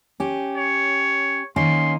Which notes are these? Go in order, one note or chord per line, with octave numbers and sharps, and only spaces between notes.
C#4 G4
C#5
D#3 A#3 C#4 C6